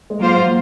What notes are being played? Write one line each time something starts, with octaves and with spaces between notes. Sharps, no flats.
G#3
F#3 A#3 F4 C5
F3